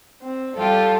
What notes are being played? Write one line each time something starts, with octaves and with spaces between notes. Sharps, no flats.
C4
G3 F4 G4 A4